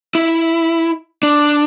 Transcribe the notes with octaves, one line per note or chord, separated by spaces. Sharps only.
E4
D4